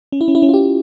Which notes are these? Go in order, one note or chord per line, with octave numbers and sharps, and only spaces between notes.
C#4
E4
C#4
E4
C#4
F4
G4